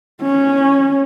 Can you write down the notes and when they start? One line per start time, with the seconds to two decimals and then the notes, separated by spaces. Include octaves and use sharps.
0.22 C#4